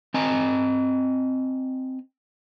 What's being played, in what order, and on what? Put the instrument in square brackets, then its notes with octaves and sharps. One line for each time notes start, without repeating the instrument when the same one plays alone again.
[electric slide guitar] C4 D#5 G#5 A#5